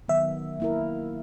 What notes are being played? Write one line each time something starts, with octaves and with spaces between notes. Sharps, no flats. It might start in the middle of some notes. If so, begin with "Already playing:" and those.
D#3 F#3 B3 E5
A#3 E4 A#4